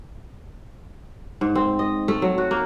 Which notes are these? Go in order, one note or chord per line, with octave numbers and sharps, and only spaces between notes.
G#2
C4
D#5
A3
F#3
F#4
A#3